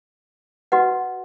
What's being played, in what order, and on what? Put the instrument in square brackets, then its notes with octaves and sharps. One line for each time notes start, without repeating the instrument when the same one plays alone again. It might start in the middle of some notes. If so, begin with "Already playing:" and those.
[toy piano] F#4 B4 D#5 F#5